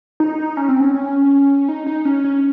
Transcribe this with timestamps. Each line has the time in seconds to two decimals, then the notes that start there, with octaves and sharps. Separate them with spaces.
0.20 D#4
0.57 C#4
0.69 C4
0.80 C#4
0.95 C#4
1.69 D#4
1.86 D#4
2.05 C#4
2.24 C#4